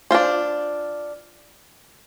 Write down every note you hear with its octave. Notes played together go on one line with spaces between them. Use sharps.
D4 F4 C5